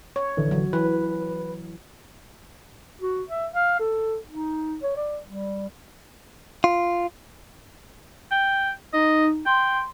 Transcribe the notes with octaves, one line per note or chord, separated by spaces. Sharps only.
C#5
A#1 D3 E3
F#3
E3 B4
F#4
E5
F5
A4
D#4
C#5
D5
G3
F4
G5
D#4 D#5
G5 C6